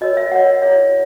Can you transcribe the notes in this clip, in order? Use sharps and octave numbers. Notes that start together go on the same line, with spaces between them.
F#4 A#4 C#5 D#5
E5
F#4 A#4 C#5 F#5
E4 G#4 C#5 E5